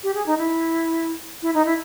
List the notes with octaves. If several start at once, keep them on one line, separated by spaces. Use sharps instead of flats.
G4
G#4
D#4
E4
E4
D#4
E4